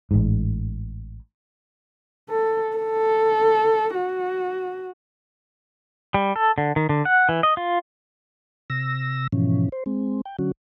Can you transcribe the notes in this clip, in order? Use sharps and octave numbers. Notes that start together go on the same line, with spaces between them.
A1 G#2
A4
A4
F#4
G3
A4
D3
D#3
D3
F#5
E3
D#5
F4
C3 E6 A#6
G#2 B2 E3 F3 C#4
C5
G#3 C4
G5
D3 F#3 C#4 F#4